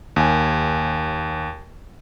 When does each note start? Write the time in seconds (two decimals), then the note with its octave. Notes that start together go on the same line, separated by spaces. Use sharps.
0.16 D#2 G#5